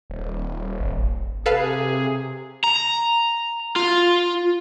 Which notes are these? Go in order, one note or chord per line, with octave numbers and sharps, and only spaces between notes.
D#1
G#1
C3 G#4 A4 B4 F5
A#5
F4